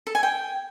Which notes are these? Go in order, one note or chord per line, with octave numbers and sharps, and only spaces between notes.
A4
G#5
G5